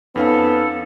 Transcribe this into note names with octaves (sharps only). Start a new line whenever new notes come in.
F2 B3 C#4 D#4 A4 F5